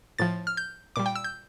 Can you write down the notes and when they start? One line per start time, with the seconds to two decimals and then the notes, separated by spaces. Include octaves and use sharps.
0.19 A2 F3 A6
0.47 F6
0.57 G6
0.96 A#2 G3 D6
1.06 G5
1.15 E6
1.24 G6